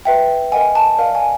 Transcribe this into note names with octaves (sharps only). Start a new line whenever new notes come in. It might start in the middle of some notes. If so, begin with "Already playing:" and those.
B4 E5 G5
A#4 D#5 F#5 G#5
A5
A#4 D5 F5
G#5